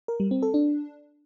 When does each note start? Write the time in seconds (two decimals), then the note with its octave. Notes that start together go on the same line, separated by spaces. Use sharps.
0.08 A#4
0.20 G3
0.31 C4
0.43 A4
0.54 D4